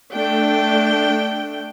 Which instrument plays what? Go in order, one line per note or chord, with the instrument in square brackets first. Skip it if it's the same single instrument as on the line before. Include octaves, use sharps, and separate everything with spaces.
[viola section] A3 D4 G5